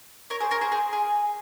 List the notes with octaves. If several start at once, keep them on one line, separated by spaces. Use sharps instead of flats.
A#4 C#5
G#4 C5
A#4 C#5
G#4 C5
G#4 C5
G#4